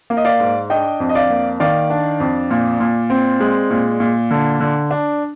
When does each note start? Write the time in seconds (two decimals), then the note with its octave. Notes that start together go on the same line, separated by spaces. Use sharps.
0.10 A#3
0.17 D#5
0.25 D5 F5
0.40 G#2
0.70 D4 D#5 G5
1.00 F2
1.09 D#5
1.15 D5 F5
1.30 A#3
1.60 D#3 D5 F5
1.90 D4
2.20 F2
2.51 A#2
2.80 A#2
3.10 C4
3.40 G#3
3.70 A#2
4.00 A#2
4.31 D3
4.60 D3
4.91 D4